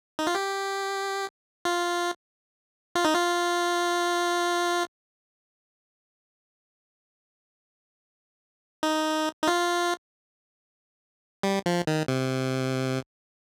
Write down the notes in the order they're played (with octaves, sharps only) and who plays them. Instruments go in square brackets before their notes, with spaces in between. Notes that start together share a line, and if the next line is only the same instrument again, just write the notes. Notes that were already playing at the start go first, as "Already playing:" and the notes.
[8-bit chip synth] D#4
F4
G4
F4
F4
D#4
F4
D#4
D#4
F4
G3
F3
D#3
C3